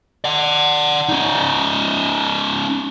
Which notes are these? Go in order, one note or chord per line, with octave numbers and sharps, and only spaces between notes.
D5 F#5
C#4 D#4